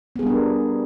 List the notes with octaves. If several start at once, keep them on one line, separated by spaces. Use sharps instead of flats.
G3 B3 D4 G#4 A#4